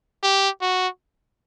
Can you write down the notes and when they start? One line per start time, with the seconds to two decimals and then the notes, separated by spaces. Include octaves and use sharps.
0.23 G4
0.61 F#4